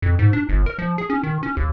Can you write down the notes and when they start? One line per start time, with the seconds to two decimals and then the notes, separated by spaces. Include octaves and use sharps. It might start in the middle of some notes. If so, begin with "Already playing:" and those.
0.02 F2
0.19 G#2
0.33 D4
0.49 G1
0.66 A#4
0.79 F3
0.98 G#4
1.10 C#4
1.23 D#3
1.43 C#4
1.57 D#2